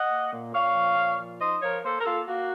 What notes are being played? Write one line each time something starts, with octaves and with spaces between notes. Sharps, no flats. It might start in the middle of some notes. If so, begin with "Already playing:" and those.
Already playing: D#5 F#5
A#3
A#2
A#2 C#5 F5
F3
A#2
F3
D#4 C5 D#5
F3 A#4 C#5
A#3 A4 C5
A#4
A#3 F4 A4
A#3 F#4